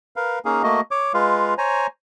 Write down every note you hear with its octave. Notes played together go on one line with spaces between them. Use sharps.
A#4 B4 F5
A#3 C#4 D#4 G#4 F5
A3 A#3 F#4 D#5
C#5 D6
G#3 F4 B4 F5
C5 C#5 G#5 A#5